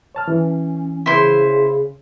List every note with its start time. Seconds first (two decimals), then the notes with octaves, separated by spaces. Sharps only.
0.15 C#5 A5 F6
0.28 E3 C#4
1.06 C#3 E4 C5